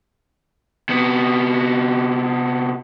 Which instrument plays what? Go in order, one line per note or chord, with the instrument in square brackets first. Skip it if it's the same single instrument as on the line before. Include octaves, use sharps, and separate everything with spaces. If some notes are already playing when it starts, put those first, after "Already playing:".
[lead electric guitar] C3 B3